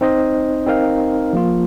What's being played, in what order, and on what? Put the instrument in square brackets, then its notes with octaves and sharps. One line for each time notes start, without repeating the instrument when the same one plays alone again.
[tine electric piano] C4 D#4 C5 D#5
C4 D#4 A#4 F5
F3 A#3 F4